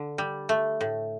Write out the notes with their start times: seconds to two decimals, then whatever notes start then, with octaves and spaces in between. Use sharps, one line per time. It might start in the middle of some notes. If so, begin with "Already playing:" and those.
Already playing: D3
0.18 G3
0.49 A3
0.81 A2